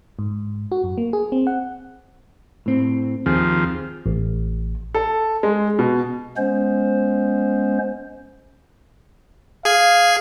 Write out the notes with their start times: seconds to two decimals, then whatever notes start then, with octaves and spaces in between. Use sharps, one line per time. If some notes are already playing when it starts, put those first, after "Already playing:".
0.19 G#2
0.72 F#4
0.84 F#2
0.98 A#3
1.13 G#4
1.32 C4
1.47 F#5
2.66 A2 C4
3.26 D#2 F3 C4 G#4
4.06 A1
4.95 A4
5.43 G#3
5.79 B2
6.37 G#3 B3 C#4 C5
9.65 G#4 F5 G#5